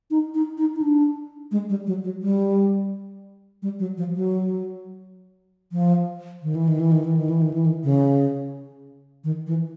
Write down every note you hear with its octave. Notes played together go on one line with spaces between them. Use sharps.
D#4
D#4
D#4
D#4
D4
G#3
G3
F#3
F#3
G3
G3
F#3
F3
F#3
F3
D#3
E3
D#3
E3
D#3
E3
D#3
E3
D#3
E3
D#3
C#3
D#3
E3